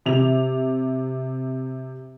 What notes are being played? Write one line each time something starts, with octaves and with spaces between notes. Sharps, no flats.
C3 F7